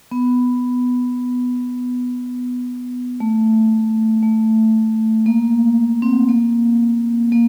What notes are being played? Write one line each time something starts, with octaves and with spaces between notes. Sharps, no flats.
B3
A3
A3
A#3
C4
A#3
A#3